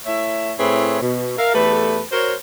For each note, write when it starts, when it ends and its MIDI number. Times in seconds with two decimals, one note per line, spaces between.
0.06 0.52 57
0.06 0.52 64
0.06 0.52 73
0.06 0.52 76
0.59 1.01 45
0.59 1.01 60
0.59 1.01 64
0.59 1.01 68
0.59 1.01 71
0.59 1.01 73
1.01 1.38 47
1.38 1.54 70
1.38 1.54 76
1.38 1.54 77
1.54 2.01 40
1.54 2.01 57
1.54 2.01 67
1.54 2.01 69
1.54 2.01 71
2.12 2.34 66
2.12 2.34 70
2.12 2.34 72
2.12 2.34 73